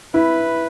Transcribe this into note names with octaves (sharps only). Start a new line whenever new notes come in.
E4 B4